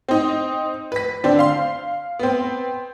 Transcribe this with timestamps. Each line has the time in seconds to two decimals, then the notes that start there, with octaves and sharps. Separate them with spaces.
0.09 C4 D#4
0.92 B4 B6
1.24 D3 C4 D4
1.39 F5 C6
2.19 B3 C4